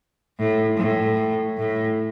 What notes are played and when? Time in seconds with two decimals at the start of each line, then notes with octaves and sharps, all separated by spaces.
0.38 A2
0.78 A2
1.57 A2